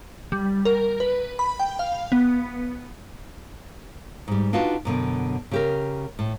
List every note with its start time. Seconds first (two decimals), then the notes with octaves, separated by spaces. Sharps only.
0.32 G3
0.65 A#4
1.00 B4
1.39 B5
1.60 G5
1.79 F5
2.12 B3
4.28 G#2 G3
4.53 D4 D#4 F4 F#4 B4
4.85 F#2 B2 D3
5.51 C#3 G4 A#4
6.19 A2